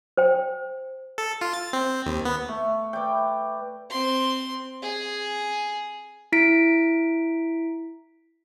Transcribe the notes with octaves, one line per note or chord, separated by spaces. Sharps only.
C5 G5
A4
F4
A6
C4
D#2
B3
A3
B4 D5 E5 G5
C4 C6
G#4
E4 B6 D7